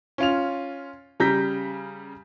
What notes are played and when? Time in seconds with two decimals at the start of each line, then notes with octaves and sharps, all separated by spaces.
0.18 C#4 F4 F7
1.20 C#3 G3 A#5 G6 A#6 B6